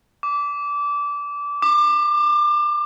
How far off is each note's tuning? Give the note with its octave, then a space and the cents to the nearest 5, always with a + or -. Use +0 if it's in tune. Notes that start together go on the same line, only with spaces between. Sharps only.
D6 -20
D6 +30